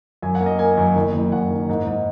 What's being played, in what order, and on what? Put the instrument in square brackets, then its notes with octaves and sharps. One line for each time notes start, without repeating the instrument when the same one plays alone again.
[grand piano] F#2 G#5
F#5
A#3
D#5
A#3 G#5
F#2
F#1
F#1
F#2 F#5
D#3
G#2
G#2